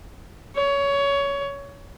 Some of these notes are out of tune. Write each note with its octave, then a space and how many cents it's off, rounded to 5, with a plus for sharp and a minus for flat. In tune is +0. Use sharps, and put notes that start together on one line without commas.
C#5 +20